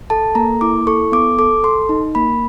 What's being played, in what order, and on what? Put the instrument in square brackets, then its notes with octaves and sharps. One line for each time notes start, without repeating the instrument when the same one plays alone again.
[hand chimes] A4 A5
A#3 A#5
E4 D6
A4 C#6
B3 D6
A4 D6
A4 C6
D#4
A#3 B5